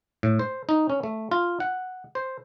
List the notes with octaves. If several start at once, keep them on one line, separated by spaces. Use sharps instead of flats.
A2
C5
D#4
C#4
A3
F4
F#5
C5